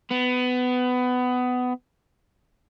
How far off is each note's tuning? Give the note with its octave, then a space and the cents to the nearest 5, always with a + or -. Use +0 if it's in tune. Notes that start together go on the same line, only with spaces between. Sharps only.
B3 +20